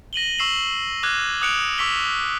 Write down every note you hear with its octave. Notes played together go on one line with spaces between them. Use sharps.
A#6 D#7 F#7 G7
C#6 E6 C7 E7 F#7
D6 F6 F#6 G#6
D6 D#6 F#6 C#7 D7 F7
C#6 D6 E6 B6 C#7 G7